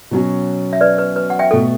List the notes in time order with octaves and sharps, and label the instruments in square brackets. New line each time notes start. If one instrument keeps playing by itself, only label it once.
[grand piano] B2 F#3 C#4
[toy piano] E5
B4 D5
B4
B4
F#5
E5 G5
[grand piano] B2 A3 [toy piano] A4